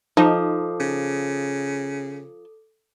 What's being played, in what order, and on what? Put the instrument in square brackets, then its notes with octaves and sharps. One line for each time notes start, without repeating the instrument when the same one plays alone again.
[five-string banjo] F3 [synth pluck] D#4 [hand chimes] A4 D6 D#6
[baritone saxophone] C#3